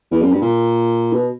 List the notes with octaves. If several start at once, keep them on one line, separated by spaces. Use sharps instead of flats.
E2
F#2
G2
A#2
B2